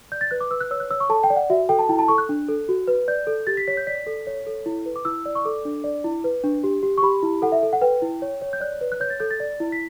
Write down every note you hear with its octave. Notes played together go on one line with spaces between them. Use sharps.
D5 G6
A6
B4 F#6
D6
B4 E6
F#6
C#5 E6
F#6
C#5 E6
C#6
A4 A5
G5
D5
F#5
F#4 E5
A4 G5
A5
E4 G5
A5
A4 C#6
F#6
D4
A4
F#4
B4
D5 G6
A4
G4 A6
B6
C#5 B6
G6
D5 B6
A4
C#5
A4
E4
B4
D6
E4 E6
D5
C#6
A4 D6
D4
D5
E4
B4
D4
G4
G4
C#6
G4 B5
E4
A4 F#5
E5
A4
F#5
B4 G5
E4
C#5
C#5
G6
D5 F#6
B4
F#6
C#5 G6
A6
A4 G6
A6
D5
E4
B6